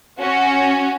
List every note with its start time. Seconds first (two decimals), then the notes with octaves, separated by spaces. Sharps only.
0.19 C#4 F#4